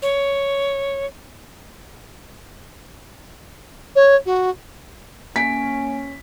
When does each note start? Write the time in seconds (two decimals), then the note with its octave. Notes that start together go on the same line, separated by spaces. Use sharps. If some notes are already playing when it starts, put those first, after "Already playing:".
0.02 C#5
3.95 C#5
4.26 F#4
5.36 A#3 C#4 G#5 B6 D7